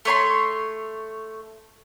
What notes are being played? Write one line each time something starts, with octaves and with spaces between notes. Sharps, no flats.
A3 C#5 B5 C6